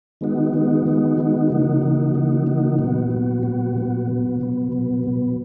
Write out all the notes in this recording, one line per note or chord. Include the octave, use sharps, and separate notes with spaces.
D#3 G#3 B3 D#4 F#4
D#3 G#3 B3 D#4 F#4
D#3 G#3 B3 D#4 F#4
D#3 G#3 B3 D#4 F#4
C#3 E3 A#3 D#4 F#4
C#3 E3 A#3 D#4 F#4
C#3 E3 A#3 D#4 F#4
C#3 E3 A#3 D#4 F#4
A#2 F#3 B3 F#4
A#2 F#3 B3 F#4
A#2 F#3 B3 F#4
A#2 F#3 B3 F#4
B2 F#3 B3
B2 F#3 B3
B2 F#3 B3
B2 F#3 B3